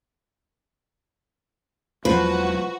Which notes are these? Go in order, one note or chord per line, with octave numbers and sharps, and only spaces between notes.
E1 F3 F#3 F#4 B4 C5